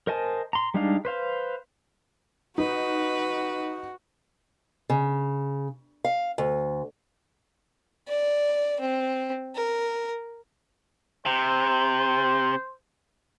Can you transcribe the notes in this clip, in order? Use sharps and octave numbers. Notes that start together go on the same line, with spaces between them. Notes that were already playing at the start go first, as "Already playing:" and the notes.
A#4 C5 D#5 G#5 A5
A#5 C6
G3 G#3 D4 D#4 F5
B4 C5 F5
D#4 F#4 B4
C#3
F5
D2
D5
C4
A#4
C3 C5